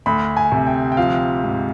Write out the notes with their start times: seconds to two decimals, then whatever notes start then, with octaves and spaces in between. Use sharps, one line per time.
0.06 D2 B5
0.37 G#5
0.52 C3
0.67 G5
0.92 G5
0.97 F3 F5
1.44 G#2